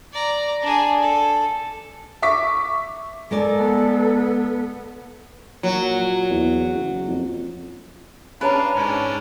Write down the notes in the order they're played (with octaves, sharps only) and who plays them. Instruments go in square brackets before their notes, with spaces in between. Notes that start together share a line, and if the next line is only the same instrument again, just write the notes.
[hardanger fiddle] D5 A#5
D4 G#4
A4
[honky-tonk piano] E5 C#6 D6 B6
[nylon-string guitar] G#3 A#4 D5 [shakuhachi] A4
[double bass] B3
[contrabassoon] A#2 [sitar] F#3
[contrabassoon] E2
F#1
F2
[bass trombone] C#4 [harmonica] D4 F5 [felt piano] G#4 C#5 A#5 [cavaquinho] B4
[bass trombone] G#2 [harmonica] C#4 D4